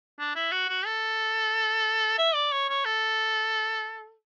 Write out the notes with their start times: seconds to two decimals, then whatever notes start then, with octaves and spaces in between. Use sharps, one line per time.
0.19 D4
0.35 E4
0.52 F#4
0.69 F#4
0.86 A4
2.18 E5
2.34 D5
2.52 C#5
2.69 C#5
2.85 A4